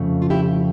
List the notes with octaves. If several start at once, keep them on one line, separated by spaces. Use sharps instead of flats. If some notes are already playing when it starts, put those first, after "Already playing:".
Already playing: F2 C#3 F3 A3
F4
E4 G4